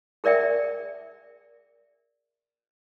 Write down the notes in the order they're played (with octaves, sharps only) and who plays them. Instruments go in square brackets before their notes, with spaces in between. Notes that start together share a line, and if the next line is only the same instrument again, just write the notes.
[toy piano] G#4 A#4 D5 E5 G5